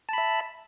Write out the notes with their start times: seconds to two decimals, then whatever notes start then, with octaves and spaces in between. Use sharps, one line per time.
0.09 A5
0.13 B5
0.18 E5